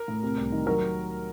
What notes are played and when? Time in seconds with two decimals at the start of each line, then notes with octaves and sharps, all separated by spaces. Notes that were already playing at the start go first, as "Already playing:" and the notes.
Already playing: A#4
0.08 A2
0.23 C3
0.37 C2
0.52 D#3
0.66 F#3 A#4